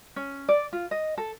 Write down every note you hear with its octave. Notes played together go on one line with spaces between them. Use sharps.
C#4
D5
F4
D#5
A4